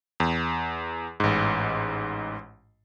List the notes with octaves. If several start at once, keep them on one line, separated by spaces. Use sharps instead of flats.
E2
A1 G#2